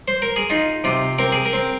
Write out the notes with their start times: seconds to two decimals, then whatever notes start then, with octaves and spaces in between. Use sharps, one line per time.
0.08 C5
0.22 A#4
0.36 G#4
0.50 D#4 F4
0.84 C3 F4
1.19 C4 A#4
1.32 G#4
1.45 A#4
1.53 C4